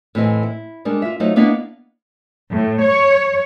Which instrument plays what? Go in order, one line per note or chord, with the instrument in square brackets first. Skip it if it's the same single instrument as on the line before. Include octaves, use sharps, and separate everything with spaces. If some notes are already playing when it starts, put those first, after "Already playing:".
[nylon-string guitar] A2 E3 C4 D#5 G#5
E4
G3 G#3 D4 A#4
F4 E5
F#3 A3 D#4 F4 C5 D#5
A#3 B3 D4 E4 D#5 F5
[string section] A2
C#5